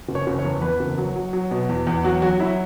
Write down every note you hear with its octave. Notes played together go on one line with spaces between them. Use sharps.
F#1
C#5
F#1
C#5
E2
E2 B4
F#1
F#3
F#3
F#3
B2
E2
E2
F#3 F#4
F#3 F#4
F#3 E4